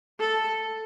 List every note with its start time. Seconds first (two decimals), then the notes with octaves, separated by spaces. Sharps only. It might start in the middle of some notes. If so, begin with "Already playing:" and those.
0.19 A4